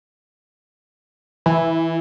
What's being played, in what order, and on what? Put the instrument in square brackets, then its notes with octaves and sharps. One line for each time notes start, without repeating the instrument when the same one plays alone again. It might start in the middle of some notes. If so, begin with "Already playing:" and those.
[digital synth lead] E3